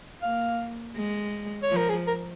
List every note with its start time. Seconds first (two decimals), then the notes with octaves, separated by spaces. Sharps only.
0.23 A#3 F5
0.96 G#3
1.63 C#5
1.70 F3
1.77 A#4
1.89 G#4
2.07 A#4